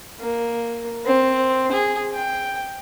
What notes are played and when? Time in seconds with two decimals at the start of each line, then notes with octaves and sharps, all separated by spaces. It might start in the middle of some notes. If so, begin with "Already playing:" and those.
0.20 A#3
1.05 C4
1.72 G#4
2.14 G5